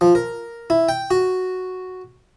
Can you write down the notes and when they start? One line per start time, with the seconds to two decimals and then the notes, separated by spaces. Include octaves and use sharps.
0.01 F3
0.15 A#4
0.70 E4
0.89 G5
1.11 F#4